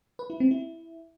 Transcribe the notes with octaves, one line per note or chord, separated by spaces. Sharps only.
B4
E4
C4
E4